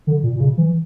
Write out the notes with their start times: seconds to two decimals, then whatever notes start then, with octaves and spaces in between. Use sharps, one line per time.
0.07 D3
0.23 A#2
0.36 A#2
0.40 C#3
0.57 E3